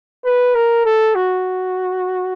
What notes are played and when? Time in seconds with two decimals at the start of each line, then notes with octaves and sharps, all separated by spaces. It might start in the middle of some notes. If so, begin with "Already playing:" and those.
0.25 B4
0.54 A#4
0.85 A4
1.15 F#4